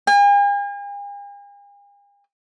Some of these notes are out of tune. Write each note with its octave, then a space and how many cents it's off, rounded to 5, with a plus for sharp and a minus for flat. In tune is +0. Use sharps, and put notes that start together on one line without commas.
G#5 -45